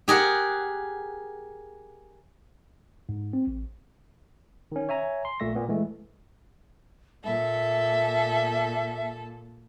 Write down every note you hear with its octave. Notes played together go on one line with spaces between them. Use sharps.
G4 G#4 A#4 F#5
G#2
C4
A1
D#3 C#4
C#5 E5 G#5 A#5
C6
A#1 A#2 A3 E5 C#6 A#6
A#2 B3
E3 G#3 A3
A#2 A4 E5